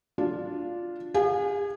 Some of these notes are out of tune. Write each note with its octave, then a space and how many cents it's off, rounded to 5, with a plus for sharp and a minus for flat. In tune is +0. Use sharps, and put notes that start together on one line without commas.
D4 +0 F4 +0
G#4 -45 F5 +45 G#5 +0